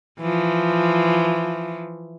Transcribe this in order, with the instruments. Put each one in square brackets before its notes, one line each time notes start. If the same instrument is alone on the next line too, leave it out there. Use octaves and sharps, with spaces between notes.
[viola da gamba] E3 F3